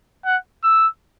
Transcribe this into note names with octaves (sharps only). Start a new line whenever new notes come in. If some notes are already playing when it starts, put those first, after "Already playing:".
F#5
E6